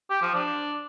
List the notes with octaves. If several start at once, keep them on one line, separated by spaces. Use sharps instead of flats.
G4
F3
D4